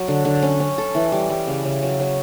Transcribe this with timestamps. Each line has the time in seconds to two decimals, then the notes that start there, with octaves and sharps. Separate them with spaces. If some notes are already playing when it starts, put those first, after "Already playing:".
Already playing: F#3
0.08 D3
0.25 D3
0.43 C#4
0.60 C#4
0.78 A4
0.95 E3
1.12 G3
1.30 G3
1.47 C#3
1.65 C#3
1.83 F#3
2.00 F#3